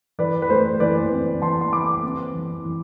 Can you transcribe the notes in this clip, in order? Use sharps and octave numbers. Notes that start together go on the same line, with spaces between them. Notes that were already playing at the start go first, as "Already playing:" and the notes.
E3 B4 D5
B4
A3 C5
E3 B4 D5
C4
E3 A5 C6
C6
E3 B5 D6
C4
E3
E3